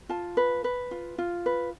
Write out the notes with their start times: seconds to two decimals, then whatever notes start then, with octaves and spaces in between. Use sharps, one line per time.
0.09 F4 A5
0.37 B4
0.64 B4
0.91 F4
1.18 F4
1.46 B4